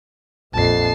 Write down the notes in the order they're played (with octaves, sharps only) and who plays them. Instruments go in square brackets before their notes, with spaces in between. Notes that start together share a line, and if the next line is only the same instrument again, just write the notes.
[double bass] A#1 F2 [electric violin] A5 C7